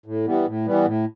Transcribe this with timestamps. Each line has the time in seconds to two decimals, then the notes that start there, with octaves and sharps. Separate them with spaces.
0.06 A2
0.26 E3 G3 B3
0.46 A2
0.66 E3 G3 B3
0.85 A2